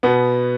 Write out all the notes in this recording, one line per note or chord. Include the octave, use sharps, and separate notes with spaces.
B2 B3